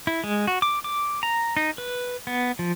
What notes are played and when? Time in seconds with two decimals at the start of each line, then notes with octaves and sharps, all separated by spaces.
0.07 E4
0.24 G#3
0.47 F#4
0.62 D6
0.84 D6
1.23 A#5
1.57 D#4
1.78 B4
2.27 B3
2.59 F3